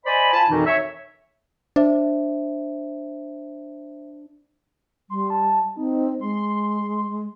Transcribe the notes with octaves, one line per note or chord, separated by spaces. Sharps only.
C5 D5 D#5 G#5 B5
F4 G#5 A5 B5
F2 B2 D#3 E3 D#4
C#5 E5
D4 C5 E5
G3 C6
A5
C4 D#4
G#3 C6